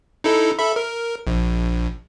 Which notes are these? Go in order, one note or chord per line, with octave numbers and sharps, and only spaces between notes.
D#4 E4 A4
A4 E5 B5
A#4
A#1